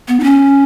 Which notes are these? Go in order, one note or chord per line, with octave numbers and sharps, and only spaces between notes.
B3
D#4
C#4